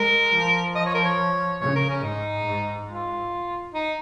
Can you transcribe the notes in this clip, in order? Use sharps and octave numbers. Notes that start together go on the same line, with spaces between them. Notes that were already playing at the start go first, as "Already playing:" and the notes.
Already playing: G#3 A#4
F3
D#5
C#5
A#4
C#5
C#3 C#5
A#4
C#4
G#2 D#4
G#2
F4
D#4